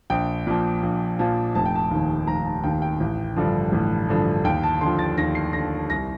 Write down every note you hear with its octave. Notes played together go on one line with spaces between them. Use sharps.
A#1 G5
A#2 F3
A#1
A#2 F3
F1 A5
G5
A5
D#2 D#3
F1 A#5
A5
D#2 D#3 G5
G5
A1
G2 D3 F3
A1
G2 D3 F3
D#2 G5
A5
D3 F3 C6
A6
D#2 A#6
C7
D3 F3 A#6
C2 A#6